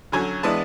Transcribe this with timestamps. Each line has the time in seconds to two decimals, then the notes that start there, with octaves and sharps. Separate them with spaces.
0.12 D3 F#3 C#4 G#5
0.43 E3 G#3 B3 D4 A5